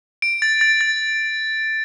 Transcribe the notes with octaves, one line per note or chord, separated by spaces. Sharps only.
D7
A6
A6
A6